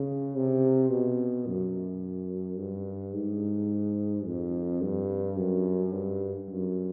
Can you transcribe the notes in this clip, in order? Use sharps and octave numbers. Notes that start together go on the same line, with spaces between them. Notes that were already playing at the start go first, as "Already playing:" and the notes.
Already playing: C#3
C3
B2
F#2
G2
G#2
F2
G2
F#2
G2
F#2